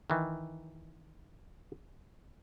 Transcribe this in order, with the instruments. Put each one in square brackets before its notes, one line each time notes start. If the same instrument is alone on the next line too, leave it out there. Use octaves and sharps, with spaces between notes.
[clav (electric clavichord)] D#3 E3